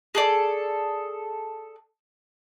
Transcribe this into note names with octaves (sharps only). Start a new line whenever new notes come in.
G#4 A4 D5